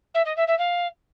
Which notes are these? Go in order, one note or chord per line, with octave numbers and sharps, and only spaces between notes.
E5
D#5
E5
E5
F5